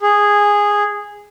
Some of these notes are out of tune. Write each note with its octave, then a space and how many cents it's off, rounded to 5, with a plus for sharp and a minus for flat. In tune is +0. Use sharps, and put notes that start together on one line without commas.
G#4 -10